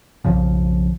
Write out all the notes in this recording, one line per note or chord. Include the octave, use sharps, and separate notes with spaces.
B1 F2 C#3 F3